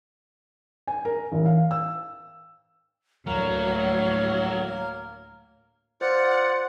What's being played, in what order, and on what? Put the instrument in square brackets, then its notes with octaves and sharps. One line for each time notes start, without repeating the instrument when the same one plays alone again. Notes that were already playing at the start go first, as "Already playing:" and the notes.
[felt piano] G#5
A#4
A1
F5
E6
[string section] D2 A2 [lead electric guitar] F#3 [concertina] A#3 A#4 [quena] C#5
[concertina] F4 D5 [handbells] C5 [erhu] F#5